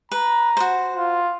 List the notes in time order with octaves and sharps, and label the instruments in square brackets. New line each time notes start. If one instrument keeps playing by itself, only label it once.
[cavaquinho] B4 [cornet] A#5
[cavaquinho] F#4 C5
[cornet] F4